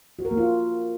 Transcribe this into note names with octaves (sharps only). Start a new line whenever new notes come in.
F#4
A#4
A#3
F4